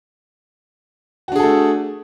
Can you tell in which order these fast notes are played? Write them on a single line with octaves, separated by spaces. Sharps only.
F#4 D4 G#4 A4 A3